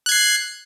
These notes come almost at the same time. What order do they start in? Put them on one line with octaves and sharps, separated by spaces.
F#6 G#6 C7